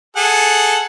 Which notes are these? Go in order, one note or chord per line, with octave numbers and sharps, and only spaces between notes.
G#4 A4 F#5